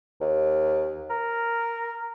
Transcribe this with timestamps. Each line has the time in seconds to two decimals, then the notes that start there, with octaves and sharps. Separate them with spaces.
0.21 D#2
1.10 A#4